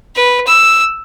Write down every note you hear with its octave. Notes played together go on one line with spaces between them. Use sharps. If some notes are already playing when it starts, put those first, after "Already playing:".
B4
E6